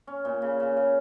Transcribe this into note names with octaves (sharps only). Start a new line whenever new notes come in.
C#4
A#2
C#3
C#3
C#3